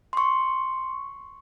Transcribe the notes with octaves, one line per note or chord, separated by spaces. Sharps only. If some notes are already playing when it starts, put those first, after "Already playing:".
C6 C#6